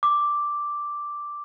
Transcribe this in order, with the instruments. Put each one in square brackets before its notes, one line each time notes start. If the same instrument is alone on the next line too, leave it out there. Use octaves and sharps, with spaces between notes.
[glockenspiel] D6